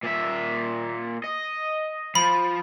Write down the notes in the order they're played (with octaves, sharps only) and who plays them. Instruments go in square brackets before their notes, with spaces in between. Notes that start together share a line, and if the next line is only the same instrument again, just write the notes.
[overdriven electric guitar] A#2 E5
D#5
[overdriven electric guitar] F3 [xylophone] B5